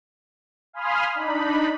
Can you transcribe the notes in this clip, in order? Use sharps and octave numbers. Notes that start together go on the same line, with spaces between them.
F5 G#5 B5 C6 D#6 F6
D4 D#4 B5